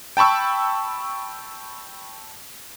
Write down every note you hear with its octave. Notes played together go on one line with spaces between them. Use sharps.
G5 A5 B5 C#6 E6